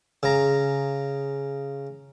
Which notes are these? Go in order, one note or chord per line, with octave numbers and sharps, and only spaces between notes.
C#3 A#5